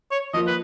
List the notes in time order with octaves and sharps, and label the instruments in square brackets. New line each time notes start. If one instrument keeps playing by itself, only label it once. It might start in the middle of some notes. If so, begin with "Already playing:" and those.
[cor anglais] C#5
[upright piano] F3 A#3 F4 [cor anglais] D#5
[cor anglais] B4